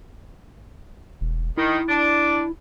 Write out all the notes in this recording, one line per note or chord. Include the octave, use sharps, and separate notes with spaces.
E1
D#3 E4
D4